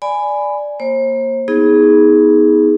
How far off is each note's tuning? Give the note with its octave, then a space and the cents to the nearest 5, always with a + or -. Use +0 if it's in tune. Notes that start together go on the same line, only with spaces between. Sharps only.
D5 +0 G#5 +0 B5 +15
A#3 +0 C5 +40
B3 -15 D#4 +35 G#4 +0